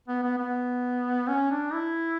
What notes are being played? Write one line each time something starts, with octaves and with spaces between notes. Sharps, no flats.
B3
B3
B3
C#4
D4
E4